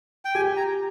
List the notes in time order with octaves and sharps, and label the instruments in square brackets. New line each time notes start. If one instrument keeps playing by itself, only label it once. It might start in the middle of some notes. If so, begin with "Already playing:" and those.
[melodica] G5
[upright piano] G4 [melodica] G#5
[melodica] A#5